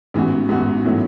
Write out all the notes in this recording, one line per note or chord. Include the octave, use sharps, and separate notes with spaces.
A1 G#2 E3 B3 F#4
A1 G#2 E3 B3 F#4
A2 F#3 B3 E4